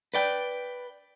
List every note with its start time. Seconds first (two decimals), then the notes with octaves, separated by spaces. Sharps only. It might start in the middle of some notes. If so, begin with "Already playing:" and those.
0.14 B4 D5 G5